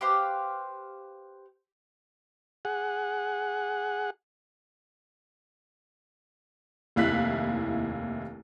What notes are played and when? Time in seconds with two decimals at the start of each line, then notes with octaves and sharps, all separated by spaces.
0.01 G4 B4 C5 F5
2.65 G#4 F#5
6.96 F1 D#2 E4 F5 F#6 B6